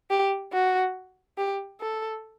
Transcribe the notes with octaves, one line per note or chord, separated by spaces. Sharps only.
G4
F#4
G4
A4